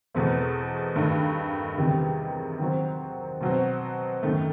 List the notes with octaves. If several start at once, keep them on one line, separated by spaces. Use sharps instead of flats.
E2 B2 A3 C4
G2 D#3 A3
E2 C3 D#3 G3
D#3 F#3 C4
B2 F#3 C4
F#2 D#3 A3